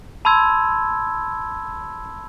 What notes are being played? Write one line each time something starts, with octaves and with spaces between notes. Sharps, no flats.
A5 B5 C6 E6 G#6